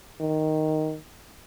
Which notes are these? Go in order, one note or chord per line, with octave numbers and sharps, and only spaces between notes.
D#3